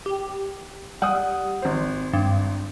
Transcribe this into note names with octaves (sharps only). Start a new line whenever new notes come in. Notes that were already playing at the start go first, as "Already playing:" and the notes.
G4
G3 F#5 D#6
G#1 C5
G2